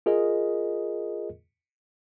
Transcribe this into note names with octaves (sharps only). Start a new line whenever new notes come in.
F4 G#4 A#4 D#5